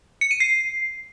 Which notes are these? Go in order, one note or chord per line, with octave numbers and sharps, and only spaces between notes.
C#7
D#7
C7